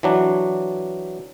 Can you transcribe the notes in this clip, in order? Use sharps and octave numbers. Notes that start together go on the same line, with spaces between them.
E3 F#3 D4